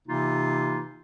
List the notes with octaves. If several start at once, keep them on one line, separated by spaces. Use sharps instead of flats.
C3 E3 A#3 D#4 F4